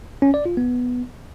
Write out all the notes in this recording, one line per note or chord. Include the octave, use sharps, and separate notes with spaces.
C#4
D5
F4
B3